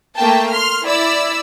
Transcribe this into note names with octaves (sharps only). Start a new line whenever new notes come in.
A3 A#3 G5 A5
C6 F6
E4 D5 E6